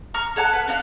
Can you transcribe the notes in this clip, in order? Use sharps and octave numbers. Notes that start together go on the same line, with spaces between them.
A#5 C#6 F6
A4 C#5 F#5 A5
B4
D4 F#4 F5